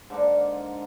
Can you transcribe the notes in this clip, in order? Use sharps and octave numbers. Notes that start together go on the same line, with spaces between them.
G#2 D3 A#3 D4